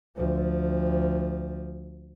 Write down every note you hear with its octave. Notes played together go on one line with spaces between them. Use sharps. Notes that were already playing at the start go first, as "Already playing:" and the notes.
D2 F3